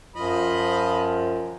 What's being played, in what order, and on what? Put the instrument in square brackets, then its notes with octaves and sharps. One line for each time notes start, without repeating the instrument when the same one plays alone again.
[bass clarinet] F#2 [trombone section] F3 [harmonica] F4 D#5 B5